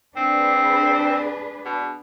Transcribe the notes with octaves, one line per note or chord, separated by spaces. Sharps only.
C4 D4 G#4 B4
B2